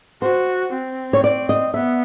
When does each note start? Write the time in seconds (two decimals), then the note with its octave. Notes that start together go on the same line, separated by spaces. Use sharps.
0.22 F#4 C5
0.73 C4
1.13 C#5
1.24 D5
1.49 D#5
1.74 B3 E5